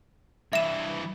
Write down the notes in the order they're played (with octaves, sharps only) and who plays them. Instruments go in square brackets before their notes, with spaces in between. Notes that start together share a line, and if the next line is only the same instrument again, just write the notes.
[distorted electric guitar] G2 E3 [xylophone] E5 E7